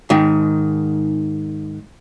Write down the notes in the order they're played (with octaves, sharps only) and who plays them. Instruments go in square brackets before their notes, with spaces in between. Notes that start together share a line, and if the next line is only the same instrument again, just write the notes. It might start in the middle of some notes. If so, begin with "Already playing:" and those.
[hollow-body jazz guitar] G#2 D#3